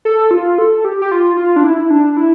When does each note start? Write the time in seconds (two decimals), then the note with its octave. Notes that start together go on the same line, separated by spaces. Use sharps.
0.05 A4
0.31 F4
0.58 A4
0.85 G4
1.02 G4
1.11 F4
1.37 F4
1.56 D4
1.64 E4
1.90 D4
2.17 E4